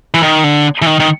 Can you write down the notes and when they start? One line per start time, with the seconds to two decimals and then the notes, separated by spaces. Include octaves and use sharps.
0.14 E3
0.23 D#3
0.44 D3
0.82 E3
0.86 D#3
1.00 D#3